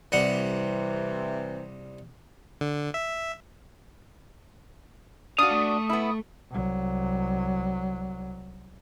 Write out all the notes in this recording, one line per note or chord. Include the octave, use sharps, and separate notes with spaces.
C2 C3 E3 G3 F#5
D3
E5
D4 F#4 F5 D#6
A3
B3 E4
C2 F#3